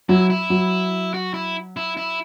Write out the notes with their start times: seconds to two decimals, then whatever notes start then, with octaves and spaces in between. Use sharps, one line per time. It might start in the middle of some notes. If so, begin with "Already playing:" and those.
0.09 F#3 E4
0.30 E4
0.50 F#3
1.14 F#4
1.34 E4
1.77 E4
1.97 E4